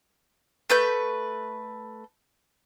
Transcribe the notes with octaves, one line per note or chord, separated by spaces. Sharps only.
A3 B4 G6